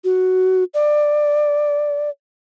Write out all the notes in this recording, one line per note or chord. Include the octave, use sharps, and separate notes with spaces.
F#4
D5